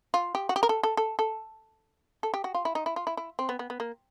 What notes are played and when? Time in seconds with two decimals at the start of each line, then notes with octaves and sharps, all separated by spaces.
0.14 F4
0.35 G4
0.49 F#4
0.56 G4
0.63 A#4
0.69 A4
0.83 A4
0.97 A4
1.19 A4
2.23 A4
2.34 G4
2.44 F#4
2.55 F4
2.65 E4
2.75 D#4
2.86 E4
2.96 F4
3.07 E4
3.17 E4
3.39 C4
3.49 B3
3.59 B3
3.70 B3
3.80 A#3